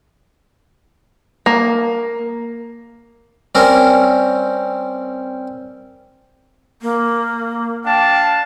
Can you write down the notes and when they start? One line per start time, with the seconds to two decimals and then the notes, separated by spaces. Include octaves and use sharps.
1.46 A#3
3.55 G3 C4 C#4 A#4
6.82 A#3
7.85 D4 F5 G5 A5